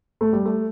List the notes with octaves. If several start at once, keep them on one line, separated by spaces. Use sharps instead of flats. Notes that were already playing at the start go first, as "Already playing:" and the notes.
A3
G3
A3